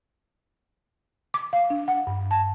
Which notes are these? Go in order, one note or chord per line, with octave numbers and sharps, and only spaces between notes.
D6
F5
D4
F#5
G2
A5